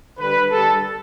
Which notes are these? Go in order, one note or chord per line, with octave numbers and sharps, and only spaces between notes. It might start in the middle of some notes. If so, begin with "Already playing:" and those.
D3 G3 B4
D3 G3 A4